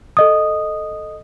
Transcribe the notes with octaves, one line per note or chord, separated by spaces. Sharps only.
A4 D#5 D#6